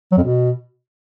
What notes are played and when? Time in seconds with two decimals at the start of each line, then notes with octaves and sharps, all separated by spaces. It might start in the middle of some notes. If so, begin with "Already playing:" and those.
0.12 F#3
0.18 F2
0.23 B2